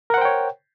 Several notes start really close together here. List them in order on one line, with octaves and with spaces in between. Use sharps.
A#4 F#5 C5 G5 C#5